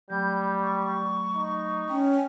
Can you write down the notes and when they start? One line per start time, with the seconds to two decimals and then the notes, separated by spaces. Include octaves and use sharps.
0.10 F#3 G3 A3 B5 G6
0.62 C#6
1.35 D#4
1.89 C#4 G5